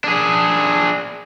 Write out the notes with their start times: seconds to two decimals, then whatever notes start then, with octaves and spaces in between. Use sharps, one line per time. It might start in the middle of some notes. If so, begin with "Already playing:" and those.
0.04 D4 G#4